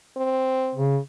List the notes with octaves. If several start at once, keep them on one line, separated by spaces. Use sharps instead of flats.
C4
C#3